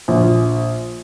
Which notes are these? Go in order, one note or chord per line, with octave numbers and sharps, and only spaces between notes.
A#1